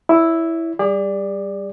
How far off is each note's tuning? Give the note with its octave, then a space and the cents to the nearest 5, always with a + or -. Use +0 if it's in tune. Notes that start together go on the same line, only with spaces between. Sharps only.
E4 +0 C#5 +40
G3 +0 G#4 -45 D5 +0